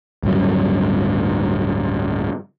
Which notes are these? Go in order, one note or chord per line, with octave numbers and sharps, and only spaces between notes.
D1 G2 C#3 F#3